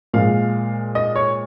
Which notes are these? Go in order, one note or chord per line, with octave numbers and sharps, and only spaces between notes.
A#2 F3 G#3 F5
D#5
C#5